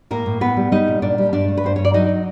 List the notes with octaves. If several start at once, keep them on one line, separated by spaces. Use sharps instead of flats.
A2 A#3 A#4
A2
A2 B3 B4
G3
G3 D#4 D#5
A#2
A#2 D4 D5
G3
G2 D4 D5
A3
B4
G2 C5
G2 C#5
D5
F#3 D#4 D#5
F#3